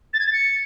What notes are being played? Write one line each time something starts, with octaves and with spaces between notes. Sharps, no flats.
A6
G#6
A6
C#7